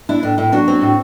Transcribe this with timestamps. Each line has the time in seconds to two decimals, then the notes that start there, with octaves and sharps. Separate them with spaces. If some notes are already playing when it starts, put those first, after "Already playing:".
0.09 D4 E4
0.23 A2 D4
0.38 A2 E4
0.52 F#3 D4 F#4
0.68 C4
0.81 A2